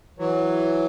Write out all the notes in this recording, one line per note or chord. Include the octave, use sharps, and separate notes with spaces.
E3 F#3